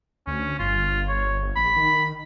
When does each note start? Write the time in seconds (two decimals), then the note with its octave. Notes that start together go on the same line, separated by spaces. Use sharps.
0.27 D2 C#4
0.59 G1 F4
1.08 C#5
1.56 A#1 B5
1.76 D#3